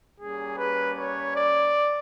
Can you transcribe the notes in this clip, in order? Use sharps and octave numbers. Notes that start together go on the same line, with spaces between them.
G3 A#3 C#4 G#4
B4
C#5
D5